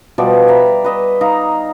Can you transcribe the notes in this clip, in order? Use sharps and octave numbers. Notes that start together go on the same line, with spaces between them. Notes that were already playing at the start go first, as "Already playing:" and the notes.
B2 F3 G3 D5
E5 A#5 B5
B4 D#5 E5
D#4 F5 A#5